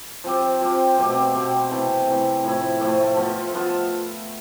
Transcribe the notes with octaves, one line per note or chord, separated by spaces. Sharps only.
F3 C4 G4
F3 C4 G4
B2 A3 C4 G4
B2 A3 C4 G4
C3 E3 A3
C3 E3 A3
A2 F3 A3 E4
A2 F3 A3 E4
F3 B3 F4 A4
F3 B3 F4 A4